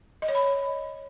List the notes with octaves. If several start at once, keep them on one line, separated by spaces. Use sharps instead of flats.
D#5
C#5
B5